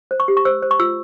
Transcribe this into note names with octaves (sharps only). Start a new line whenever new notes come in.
C5
C#6
G4
C#6
C5 E6
C5
C#6
F4 E6